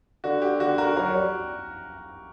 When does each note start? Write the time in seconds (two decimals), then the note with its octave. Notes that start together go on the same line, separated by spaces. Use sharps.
0.24 D3 F#4
0.42 G4
0.60 D3 F#4
0.78 F#4 A#4
0.97 F#3 F#4 A#4
1.15 G3